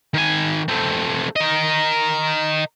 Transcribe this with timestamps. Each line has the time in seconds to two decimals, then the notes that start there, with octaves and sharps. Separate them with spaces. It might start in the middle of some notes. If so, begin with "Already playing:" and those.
0.14 D#3 G#5
0.69 A3 C4
1.36 A#4 D#5